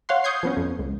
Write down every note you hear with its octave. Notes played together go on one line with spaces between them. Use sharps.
C#5 F5 F#5 C6
C#6 D#6 G6 G#6 C7
F3 B3 C#4
F2
C#2